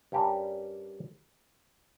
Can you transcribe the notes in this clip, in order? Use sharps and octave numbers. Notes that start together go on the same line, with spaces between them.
G2 G3 C#4 G4 A#4